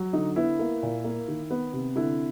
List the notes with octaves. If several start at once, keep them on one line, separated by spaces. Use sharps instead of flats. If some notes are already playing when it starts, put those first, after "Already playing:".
Already playing: F#3
D3 D#4
B3 E4
A#3
A#2
A#3
D#3
B3
C3
D3 E4